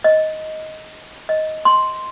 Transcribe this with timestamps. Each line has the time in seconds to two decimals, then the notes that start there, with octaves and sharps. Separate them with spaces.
0.04 D#5
1.29 D#5
1.65 C6